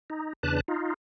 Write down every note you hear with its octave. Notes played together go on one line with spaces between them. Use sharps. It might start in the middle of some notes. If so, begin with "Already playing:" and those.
D#4
E2 C#3 D4 B4 A5 F#6
D#4 F4